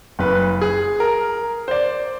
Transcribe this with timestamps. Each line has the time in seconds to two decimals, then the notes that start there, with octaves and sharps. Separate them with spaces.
0.19 F#1 B4
0.61 G#4
1.00 A#4
1.68 C5 D5